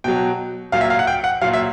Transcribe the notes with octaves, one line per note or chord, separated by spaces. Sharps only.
B2 F#3 G5
A#2 F#3 F5
E5
F5
F#5
G5
F#5
A#2 F#3 F5
E5